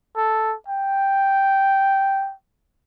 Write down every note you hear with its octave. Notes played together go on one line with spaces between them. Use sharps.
A4
G5